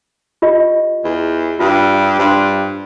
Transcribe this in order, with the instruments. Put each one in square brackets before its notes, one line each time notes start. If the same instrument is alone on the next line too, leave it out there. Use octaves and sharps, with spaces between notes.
[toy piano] F4 G4 D#5
[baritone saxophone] E2
[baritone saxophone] G2 [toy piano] F4
[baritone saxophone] G2 [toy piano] C5 C6